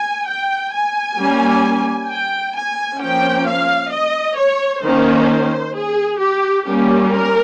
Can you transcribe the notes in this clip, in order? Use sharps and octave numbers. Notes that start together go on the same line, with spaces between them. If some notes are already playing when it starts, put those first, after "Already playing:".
Already playing: G#5
G5
G#5
G3 A#3 C#4
G5
G#5
F3 A#3 C#4 G5
F5
D#5
C#5
D#3 A#3 C#4 C5
G#4
G4
G3 A#3 C#4 G4
A#4